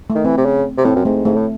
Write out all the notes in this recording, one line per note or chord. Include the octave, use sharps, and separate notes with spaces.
A3
D#3
E3 C4
C3
C#3
C3
A2 C4
F#2
G#2 A3
G#2 A3
A2